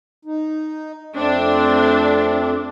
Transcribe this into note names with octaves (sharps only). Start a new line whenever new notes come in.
D#4
F2 A3 C4 D4